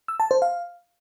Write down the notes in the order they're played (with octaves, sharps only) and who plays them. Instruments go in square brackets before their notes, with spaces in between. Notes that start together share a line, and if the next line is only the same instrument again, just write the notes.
[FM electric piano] E6
A5
C5
F5